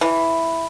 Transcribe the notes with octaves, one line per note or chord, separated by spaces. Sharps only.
E3